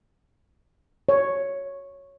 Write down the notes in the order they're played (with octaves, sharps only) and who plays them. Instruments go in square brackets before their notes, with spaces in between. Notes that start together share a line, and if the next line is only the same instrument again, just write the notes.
[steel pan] C#5